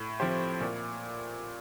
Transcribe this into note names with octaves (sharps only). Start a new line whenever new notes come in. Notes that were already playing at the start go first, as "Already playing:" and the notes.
Already playing: A2
F3 C4 G4 C5
A#2